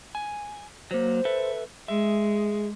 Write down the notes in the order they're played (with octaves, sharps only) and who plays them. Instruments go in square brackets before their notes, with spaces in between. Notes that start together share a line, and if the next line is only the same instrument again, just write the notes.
[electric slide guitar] G#5
[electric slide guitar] F#3 A#3 [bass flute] C5
[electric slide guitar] A4 B4 E5
[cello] G#3 [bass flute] G#4 [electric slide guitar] E5